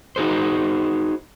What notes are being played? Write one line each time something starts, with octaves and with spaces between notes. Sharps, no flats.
D#4 F#4 G#4 C5